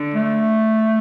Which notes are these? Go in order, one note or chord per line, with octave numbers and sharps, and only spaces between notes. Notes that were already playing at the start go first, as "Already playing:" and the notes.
Already playing: D3
A3